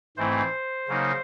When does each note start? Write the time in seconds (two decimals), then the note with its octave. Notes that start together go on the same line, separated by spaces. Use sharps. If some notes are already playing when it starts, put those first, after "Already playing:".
0.17 G#2 E3 A3 C4 E4 C5
0.88 C#3 F#3 A#3 D#4